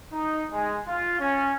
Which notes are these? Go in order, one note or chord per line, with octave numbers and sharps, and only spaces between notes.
D#4
G#3
F4
C#4